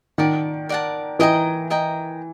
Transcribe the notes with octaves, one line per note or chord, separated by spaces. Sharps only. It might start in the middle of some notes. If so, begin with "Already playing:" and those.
D#3 A#4 D5 F#5 A5
A#4 D5 F#5 A5
E3 A#4 D#5 G5 A#5
A#4 D#5 G5 A#5